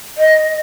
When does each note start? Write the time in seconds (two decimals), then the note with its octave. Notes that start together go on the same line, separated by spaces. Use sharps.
0.17 D#5